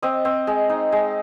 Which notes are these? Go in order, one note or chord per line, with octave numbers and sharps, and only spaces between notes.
C4 D#5
C4
G#3
D#4
G#3